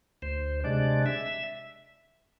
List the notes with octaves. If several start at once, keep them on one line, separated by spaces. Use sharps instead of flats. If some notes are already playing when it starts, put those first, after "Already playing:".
D2 C5
C3 G#3 D4 D5
E5